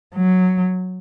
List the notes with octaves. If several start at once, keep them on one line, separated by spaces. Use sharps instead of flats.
F#3